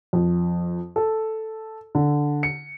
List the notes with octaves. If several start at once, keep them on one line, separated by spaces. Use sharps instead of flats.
F2
A4
D3
C#7